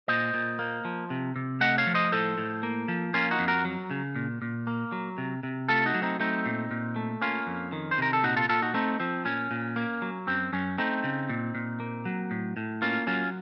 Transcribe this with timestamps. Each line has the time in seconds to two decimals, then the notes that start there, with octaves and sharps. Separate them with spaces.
0.08 A#2 C5 D#5
0.34 A#2
0.59 A#3
0.85 F3
1.10 C3
1.36 C3
1.61 A3 D#5 F#5
1.78 C#5 F5
1.87 F3
1.95 C5 D#5
2.12 A2 A4 C5
2.38 A2
2.63 A#3
2.88 F3
3.14 A#3 C#4 F4
3.31 D#4 F#4
3.39 F2
3.48 F#4 A#4
3.65 F#3
3.91 C#3
4.15 A#2
4.42 A#2
4.67 A#3
4.92 F#3
5.18 C3
5.43 C3
5.68 A3 F4 A4
5.86 D#4 F#4
5.94 F#3
6.02 C4 D#4
6.20 A3 C4 D#4
6.46 A#2
6.71 A#2
6.96 A3
7.21 A#3 C#4 F4
7.47 F2
7.72 D#3
7.91 C5
7.98 C3 A#4
8.13 A4
8.23 A#2 D#4 F#4
8.36 F4 A4
8.49 A#2 F4 A4
8.62 D#4 F#4
8.74 A3 C4 D#4
9.00 F3 C4
9.25 A#2 C#4
9.51 A#2
9.76 A#3
10.02 F#3
10.27 F#2 C4
10.53 F#2 C#4
10.78 A3 C4 D#4
11.04 C#3
11.29 A#2
11.55 A#2
11.80 A#3
12.05 F#3
12.31 A2
12.57 A2
12.82 A#3 C#4 F4
13.07 F#3 C#4 F4